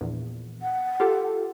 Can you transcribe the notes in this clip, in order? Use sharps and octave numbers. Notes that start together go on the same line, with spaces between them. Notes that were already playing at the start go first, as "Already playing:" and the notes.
A#1 E2
F#5
F4 G4 A4